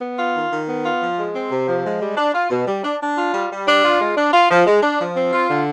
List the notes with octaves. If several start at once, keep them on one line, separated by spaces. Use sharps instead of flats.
B3
F4
D#3
D#3
B3
F4
F3
G#3
C4
C3
F3
G#3
G3
D4
F4
B2
G3
D4
D4
F4
G3
G3
D4
F4
G#3
D4
F4
F3
G#3
D4
F3
C4
F4
D3